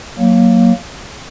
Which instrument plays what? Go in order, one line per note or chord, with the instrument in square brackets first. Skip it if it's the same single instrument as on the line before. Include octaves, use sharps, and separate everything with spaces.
[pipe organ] F#3 A#3